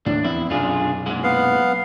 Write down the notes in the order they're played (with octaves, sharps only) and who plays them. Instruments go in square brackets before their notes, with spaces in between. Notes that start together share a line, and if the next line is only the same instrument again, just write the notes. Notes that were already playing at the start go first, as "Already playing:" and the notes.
[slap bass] D#2 A2 [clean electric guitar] D4
[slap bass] E2 B3 C4 [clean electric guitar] E4
[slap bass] B1 F#2 C3 [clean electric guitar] D4 F4 G#4
[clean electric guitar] A#2 G#3 F#5
[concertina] B3 F5